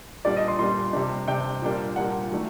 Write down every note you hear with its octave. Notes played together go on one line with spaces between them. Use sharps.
A#2 G3 D4 D5
D#5
C6
A#2 G3 D4 C6
C3 G3 D4
C3 G3 D4 G5
A#2 G3 A#3 D4
A#2 G3 A#3 D4 F#5
D#3 F#3 A3 D4